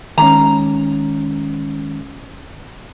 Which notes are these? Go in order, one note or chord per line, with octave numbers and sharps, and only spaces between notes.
D#3 G#3 C#4 A#5